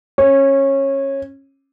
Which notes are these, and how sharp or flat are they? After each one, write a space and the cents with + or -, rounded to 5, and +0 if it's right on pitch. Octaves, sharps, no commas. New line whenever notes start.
C#4 -20